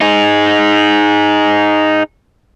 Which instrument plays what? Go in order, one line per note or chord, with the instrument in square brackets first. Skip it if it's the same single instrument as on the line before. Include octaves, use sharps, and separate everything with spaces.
[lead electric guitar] D#4 G#4